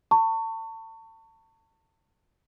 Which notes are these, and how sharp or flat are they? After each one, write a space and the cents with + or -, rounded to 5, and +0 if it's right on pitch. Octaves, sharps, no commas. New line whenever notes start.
A5 +35 C#6 +0